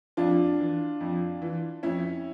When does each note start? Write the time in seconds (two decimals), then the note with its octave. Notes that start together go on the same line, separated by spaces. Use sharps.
0.17 F2 D4 F4
0.59 E3
1.01 F2
1.42 E3
1.83 F2 C#4 E4